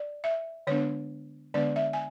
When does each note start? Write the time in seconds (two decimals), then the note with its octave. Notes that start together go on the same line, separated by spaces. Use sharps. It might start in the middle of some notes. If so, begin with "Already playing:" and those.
Already playing: D5
0.24 E5
0.67 D3 G#3 B3 D4 C#5
1.54 D3 G#3 B3 D4 D5
1.76 E5
1.93 G#5